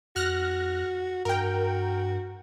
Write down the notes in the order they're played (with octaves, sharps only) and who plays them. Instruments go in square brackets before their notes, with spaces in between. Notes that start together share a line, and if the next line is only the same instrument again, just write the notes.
[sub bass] F2 [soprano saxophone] F#4 [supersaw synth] F6 F#6 A#6
[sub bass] G2 [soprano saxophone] F#4 [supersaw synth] A#4 G5